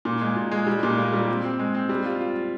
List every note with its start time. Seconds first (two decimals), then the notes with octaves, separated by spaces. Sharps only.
0.05 A#2
0.21 G#3
0.36 A#2
0.52 G#3
0.67 G3
0.83 A#2
0.97 A#3
1.13 G3
1.28 C4
1.44 C4
1.59 G#3
1.75 C4
1.89 G3
2.05 F4
2.20 F4
2.36 F4